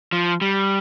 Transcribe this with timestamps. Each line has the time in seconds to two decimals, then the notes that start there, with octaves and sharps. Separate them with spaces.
0.12 F3
0.41 G3